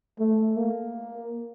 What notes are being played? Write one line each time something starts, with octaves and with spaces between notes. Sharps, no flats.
A3
A#3